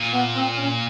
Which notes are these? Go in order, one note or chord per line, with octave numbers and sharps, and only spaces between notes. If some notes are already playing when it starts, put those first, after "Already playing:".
Already playing: A#2
B3
C4
C#4